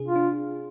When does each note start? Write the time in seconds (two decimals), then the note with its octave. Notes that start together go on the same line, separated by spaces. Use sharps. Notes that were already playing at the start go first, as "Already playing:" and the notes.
Already playing: C3 D4 G#4
0.08 F4
0.16 D4